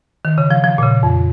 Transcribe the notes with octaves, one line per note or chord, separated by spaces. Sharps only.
D#3
C#3
F3
F3
A#2
C#3
F2